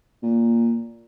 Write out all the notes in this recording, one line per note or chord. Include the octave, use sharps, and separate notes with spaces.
A#2